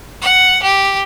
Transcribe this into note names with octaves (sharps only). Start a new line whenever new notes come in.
F#5
G4